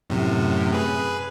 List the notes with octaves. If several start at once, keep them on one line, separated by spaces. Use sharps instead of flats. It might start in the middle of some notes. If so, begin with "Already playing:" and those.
F#2 A2 C3
G#4 B4